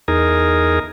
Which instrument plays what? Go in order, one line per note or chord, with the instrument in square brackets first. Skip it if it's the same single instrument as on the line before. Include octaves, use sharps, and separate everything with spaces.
[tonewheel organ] E2 D#4 G#4 A#4